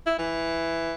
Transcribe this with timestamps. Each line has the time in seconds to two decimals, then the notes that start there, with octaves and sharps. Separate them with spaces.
0.06 E4
0.18 E3